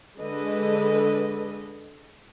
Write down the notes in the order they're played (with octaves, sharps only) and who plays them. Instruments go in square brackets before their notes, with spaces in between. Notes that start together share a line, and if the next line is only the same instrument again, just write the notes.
[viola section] D3 G#3 A4 B4 D#5